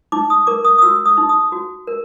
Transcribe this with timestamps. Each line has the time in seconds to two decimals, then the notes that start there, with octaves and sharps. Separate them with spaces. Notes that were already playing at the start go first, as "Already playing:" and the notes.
0.12 D#4 D6
0.30 D#6
0.47 A#4 D6
0.65 D#6
0.78 D#6
0.82 F#4 E6
1.06 D#6
1.18 D#4
1.29 D#6
1.52 F#4
1.87 A#4